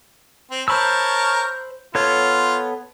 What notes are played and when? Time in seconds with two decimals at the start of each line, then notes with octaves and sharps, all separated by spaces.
0.51 C4
0.68 A#4 C5 C#5 A5 B5 E6
1.95 B3 F4 A4 C#5